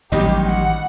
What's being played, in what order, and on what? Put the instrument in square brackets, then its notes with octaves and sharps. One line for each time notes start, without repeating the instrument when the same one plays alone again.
[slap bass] A1 D#3 F#3 [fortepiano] G3 D#4 [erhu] G4
[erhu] F#5